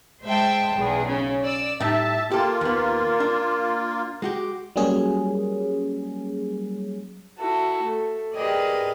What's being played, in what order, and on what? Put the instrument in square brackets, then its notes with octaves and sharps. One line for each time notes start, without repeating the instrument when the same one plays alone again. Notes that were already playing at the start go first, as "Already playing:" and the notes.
[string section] G#3 C5 E5 G5 A5
B1 E2 G#4
C#3 C#4
D5 E6
[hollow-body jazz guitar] A2 G3 D#4 [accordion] E5 A5
[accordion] A#3 F4 [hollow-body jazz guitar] G4 A4
[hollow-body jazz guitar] D#2 B3
D4
G#3 F#4 G4
[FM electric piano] F#3 G3 A#3 C#4 G#4
[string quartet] E4 F#4 A4
A3
G4 G#4 A#4 B4 D5 D#5